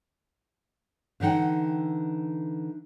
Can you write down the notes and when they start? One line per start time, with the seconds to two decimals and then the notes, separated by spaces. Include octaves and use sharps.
1.20 D3 E3 D#4 F#5 G5